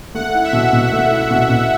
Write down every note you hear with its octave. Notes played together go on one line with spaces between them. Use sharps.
A3 F#5
E4
E5
B2
B2
A3
E4
B2
B2